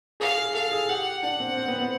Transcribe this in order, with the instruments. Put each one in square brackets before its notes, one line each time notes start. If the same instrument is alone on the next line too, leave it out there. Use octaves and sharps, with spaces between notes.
[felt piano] G#4 [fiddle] F5
[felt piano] G#4
[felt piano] A4 [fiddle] F5
[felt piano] G#4
[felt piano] G4 [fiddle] F#5
[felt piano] D4 [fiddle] F#5
[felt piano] C4
C4
B3
C4